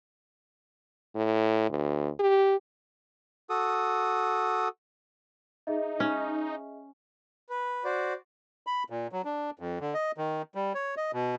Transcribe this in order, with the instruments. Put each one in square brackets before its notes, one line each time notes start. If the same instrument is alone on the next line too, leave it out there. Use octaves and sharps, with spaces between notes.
[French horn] A2
D2
G4
[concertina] F#4 A4 D#6
[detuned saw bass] D#4 [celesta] G#4 D#5 E5
[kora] C#4
[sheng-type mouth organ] B4
F#4 C5 D5
[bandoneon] B5
A#2
F#3
D4
F2
D3
D#5
D#3
G3
C#5
D#5
B2